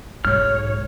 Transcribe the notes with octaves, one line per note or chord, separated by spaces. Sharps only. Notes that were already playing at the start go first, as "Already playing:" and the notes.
B1 G#2 C#5 F6